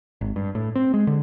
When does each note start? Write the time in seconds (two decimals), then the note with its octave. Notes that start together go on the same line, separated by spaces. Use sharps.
0.21 G#1
0.36 G2
0.55 A2
0.75 C4
0.94 G#3
1.07 D3